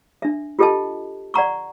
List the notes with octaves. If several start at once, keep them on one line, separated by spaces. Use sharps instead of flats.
D4 E5
F4 G4 A4 D#5 G5 A5
D5 F#5 A#5 C#6